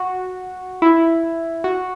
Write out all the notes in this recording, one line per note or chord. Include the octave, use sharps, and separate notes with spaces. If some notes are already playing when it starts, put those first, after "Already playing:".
Already playing: F#4
E4
F#4